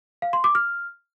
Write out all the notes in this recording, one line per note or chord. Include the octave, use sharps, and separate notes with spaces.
F5
C6
D6
F6